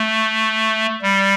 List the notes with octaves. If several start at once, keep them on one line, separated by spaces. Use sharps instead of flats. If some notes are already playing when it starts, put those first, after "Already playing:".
Already playing: A3
G3